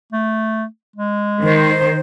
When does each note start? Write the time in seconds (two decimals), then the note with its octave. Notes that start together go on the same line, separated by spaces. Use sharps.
0.12 A3
0.96 G#3
1.42 D#3 C5